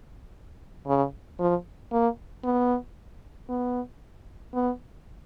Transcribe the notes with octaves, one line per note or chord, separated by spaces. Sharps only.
C#3
F3
A#3
B3
B3
B3